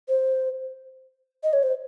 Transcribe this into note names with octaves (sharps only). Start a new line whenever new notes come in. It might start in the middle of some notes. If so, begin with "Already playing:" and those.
C5
D#5
C#5
C5